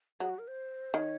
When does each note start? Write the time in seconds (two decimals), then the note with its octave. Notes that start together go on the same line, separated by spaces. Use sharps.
0.20 F#3 G#4
0.30 F#4
0.39 A#4
0.48 C5
0.94 D#3 C#5